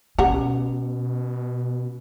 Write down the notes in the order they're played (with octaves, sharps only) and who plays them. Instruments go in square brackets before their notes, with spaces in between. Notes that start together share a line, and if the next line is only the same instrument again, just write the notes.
[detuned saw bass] B2 [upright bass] C#4 [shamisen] G4 F#5 A#5